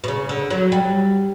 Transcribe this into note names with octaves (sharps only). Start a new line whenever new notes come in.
B2
C#3
D3
F#3
G3